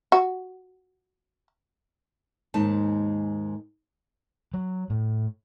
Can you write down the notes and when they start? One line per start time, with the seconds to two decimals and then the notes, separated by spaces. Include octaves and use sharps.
0.12 F#4
2.54 D#2 G#2 G#3 D#4 A5
4.54 F#3
4.90 A2